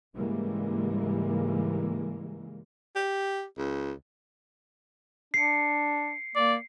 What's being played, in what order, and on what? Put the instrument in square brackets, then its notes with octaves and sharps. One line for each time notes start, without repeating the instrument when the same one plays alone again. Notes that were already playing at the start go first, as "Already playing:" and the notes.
[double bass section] G#2 C#3 E3 G3 G#3 A#3
[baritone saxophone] G4
C#2
[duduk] D4 [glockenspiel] C7 C#7
[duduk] A#3 [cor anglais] D5